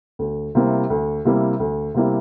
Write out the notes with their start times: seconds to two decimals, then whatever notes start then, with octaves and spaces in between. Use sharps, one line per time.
0.19 D2
0.55 C3 G3 A#3 E4
0.90 D2
1.25 C3 G3 A#3 E4
1.60 D2
1.94 C3 G3 A#3 E4